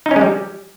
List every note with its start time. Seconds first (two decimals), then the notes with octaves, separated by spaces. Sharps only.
0.06 D#4
0.11 C#4
0.16 G#3
0.21 G3